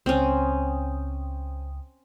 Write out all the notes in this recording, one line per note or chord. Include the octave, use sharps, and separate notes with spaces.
C#2 C4 C#4 G5 D#6